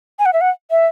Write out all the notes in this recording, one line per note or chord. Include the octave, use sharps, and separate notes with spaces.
G#5
F#5
E5
F#5
E5